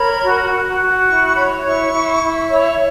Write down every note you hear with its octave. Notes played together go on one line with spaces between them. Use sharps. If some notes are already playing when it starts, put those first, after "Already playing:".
Already playing: A#4 C#5 B5
F#4
F#4
F#4
E4 C#6
C#6
C#5 B5
E4 C#6
E4
E4
C#5